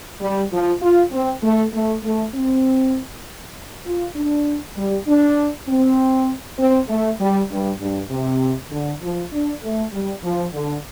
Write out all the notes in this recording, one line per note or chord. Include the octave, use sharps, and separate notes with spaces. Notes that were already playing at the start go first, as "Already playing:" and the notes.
G3
F3
F4
C4
A3
A3
A3
C4
F4
D4
G3
D4
C4
C4
A3
G3
G2
G2
C3
D3
F3
D4
A3
G3
F3
D3